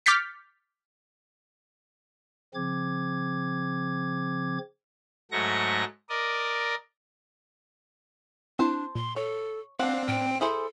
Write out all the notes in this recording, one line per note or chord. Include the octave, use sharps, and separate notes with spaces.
D6 F6 G6 A6 B6 C#7
C#3 F3 C4 D6 G#6
G#2 F#3 A3 C#6 A#6
A#4 D5 D#5
C4 D4 E4 C5 A5
A#2 C6
A4 C#5
C4 D4 F5 F#5
A2 G5 F6
E4 G#4 A4 C5